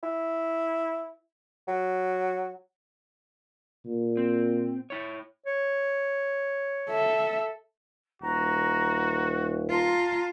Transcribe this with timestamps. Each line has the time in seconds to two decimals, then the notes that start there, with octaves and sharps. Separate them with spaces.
0.03 E4
1.68 F#3
3.85 A#2
4.17 C4
4.90 E4 C#5
5.46 C#5
6.90 A4 E5
8.22 D#1 F#4 A#5
9.70 F4 A5 A#5 C6